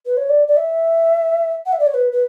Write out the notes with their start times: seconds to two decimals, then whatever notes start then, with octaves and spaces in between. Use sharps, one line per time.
0.06 B4
0.17 C#5
0.29 D5
0.47 D5
0.57 E5
1.66 F#5
1.72 E5
1.80 D5
1.87 C#5
1.94 B4
2.12 B4